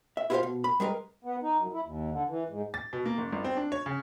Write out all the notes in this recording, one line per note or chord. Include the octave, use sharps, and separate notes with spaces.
E5
E4 F4 G4 B4 C5 F5
B2
B5
G3 G#3 G#4 A#4 B4
B3
D#4
F#2
E4
D#2
D3
E3
G#2
A6
B2
A#3
F#1
G1
C4
D4
C#5
C#3